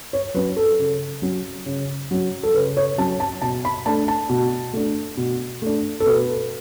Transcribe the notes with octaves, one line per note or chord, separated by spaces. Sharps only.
C#5
F#3 C#4 B4
A4
C#3
F#3 C#4
C#3
F#3 C#4
A4
C#3 B4
C#5
F#3 C#4 A5
A5
B2 A5
B5
A3 D4 A5
A5
B2
A3 D4
B2
A3 D4
A4
B2 B4